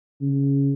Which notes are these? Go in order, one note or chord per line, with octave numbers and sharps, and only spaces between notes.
C#3